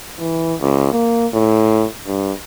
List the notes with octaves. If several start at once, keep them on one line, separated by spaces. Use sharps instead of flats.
E3
C#2
A#3
A2
G2